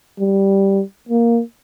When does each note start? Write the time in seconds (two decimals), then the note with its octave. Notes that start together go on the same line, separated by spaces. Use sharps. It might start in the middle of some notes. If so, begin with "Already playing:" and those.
0.19 G3
1.09 A#3